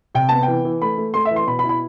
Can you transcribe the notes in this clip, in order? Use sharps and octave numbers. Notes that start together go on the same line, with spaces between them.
C3 G5
B3 A5
E3 G5
E3
A3 B5
A3
A3 C6
E5
E3
C6
B2 B5
B5
E4
B5